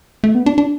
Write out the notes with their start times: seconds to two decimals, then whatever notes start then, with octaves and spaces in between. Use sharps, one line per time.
0.24 A3
0.35 B3
0.46 D4
0.58 D4